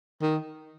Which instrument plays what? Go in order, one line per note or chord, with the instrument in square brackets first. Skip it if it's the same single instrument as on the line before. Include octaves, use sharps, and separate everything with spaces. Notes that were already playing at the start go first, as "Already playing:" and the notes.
[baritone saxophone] D#3